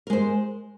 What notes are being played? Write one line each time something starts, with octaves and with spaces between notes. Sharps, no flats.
G#3 A#4 C5